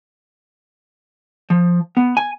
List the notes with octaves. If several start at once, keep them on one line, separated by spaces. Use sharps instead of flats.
F3
B3
G#5